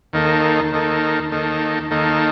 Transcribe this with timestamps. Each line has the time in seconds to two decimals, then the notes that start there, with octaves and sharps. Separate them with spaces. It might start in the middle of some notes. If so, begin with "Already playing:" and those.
0.13 D#2 D#3 A#3 D#4 A4
0.72 D#2 D#3 A#3 D#4 A4
1.32 D#2 D#3 A#3 D#4 A4
1.90 D#2 D#3 A#3 D#4 A4